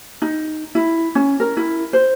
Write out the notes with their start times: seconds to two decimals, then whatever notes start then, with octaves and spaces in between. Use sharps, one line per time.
0.22 D#4
0.75 E4
1.15 C#4
1.40 A#4
1.57 E4
1.93 C5